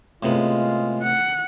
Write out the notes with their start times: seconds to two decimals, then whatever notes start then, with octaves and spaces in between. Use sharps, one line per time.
0.23 A2 C3 G#3 B3 F4
1.03 F#5